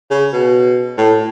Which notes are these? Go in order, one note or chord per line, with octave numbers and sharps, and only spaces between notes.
C#3
B2
A2